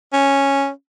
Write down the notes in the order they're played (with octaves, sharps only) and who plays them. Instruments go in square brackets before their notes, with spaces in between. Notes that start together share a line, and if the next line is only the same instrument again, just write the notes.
[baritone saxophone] C#4